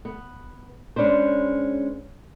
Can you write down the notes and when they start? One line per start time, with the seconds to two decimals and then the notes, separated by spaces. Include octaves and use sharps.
0.05 B3
0.96 G#3 C#4 D4 B4 C5